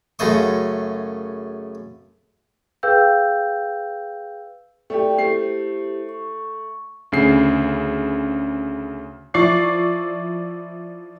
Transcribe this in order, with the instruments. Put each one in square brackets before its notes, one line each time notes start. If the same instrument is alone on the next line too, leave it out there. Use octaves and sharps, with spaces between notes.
[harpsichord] F#2 C#3 A3 D#5 C#6
[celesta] G#4 B4 F5 G5 E6 G6
[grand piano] A3 G4 [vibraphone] E4 D5 G5
[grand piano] A3 C7 [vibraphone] E4 G4 C5
[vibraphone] C#6
[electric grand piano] D2 C#3 C7
[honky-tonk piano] F3 E4 D5 C#6 C7